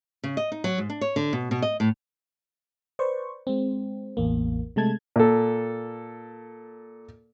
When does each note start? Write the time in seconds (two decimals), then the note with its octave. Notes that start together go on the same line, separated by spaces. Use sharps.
0.24 C#3
0.37 D#5
0.52 D#4
0.64 F#3
0.78 G#2
0.90 D4
1.01 C#5
1.16 D3
1.33 B2
1.51 B2
1.62 D#5
1.80 A2
2.99 B4 C5 D5 C#6
3.47 G#3 C4
4.17 A1 E2 A#3
4.76 C3 G#3 A3 A5 G#6
5.16 A#2 A4